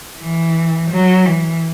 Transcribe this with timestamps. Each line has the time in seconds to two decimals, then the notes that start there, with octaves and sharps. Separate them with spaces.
0.19 E3
0.91 F#3
1.26 E3